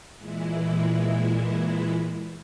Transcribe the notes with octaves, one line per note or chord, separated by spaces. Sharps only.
A#2 E3 G#3 E4